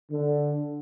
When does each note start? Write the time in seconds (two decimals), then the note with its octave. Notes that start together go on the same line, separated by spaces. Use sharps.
0.11 D3